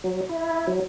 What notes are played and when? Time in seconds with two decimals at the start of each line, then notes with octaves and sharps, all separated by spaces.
0.04 F#3
0.29 E4
0.67 F#3